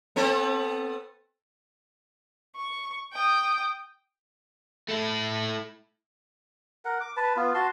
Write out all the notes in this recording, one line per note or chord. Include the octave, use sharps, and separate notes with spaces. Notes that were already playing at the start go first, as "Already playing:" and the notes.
B3 C4 A4
C#6
G5 D#6
A3 E4
A#4 F#5
D6
B4 A5
B3 F4
F#4 A5 C6